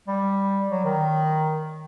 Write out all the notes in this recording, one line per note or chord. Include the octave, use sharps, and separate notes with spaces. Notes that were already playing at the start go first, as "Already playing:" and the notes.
G3
F#3
D#3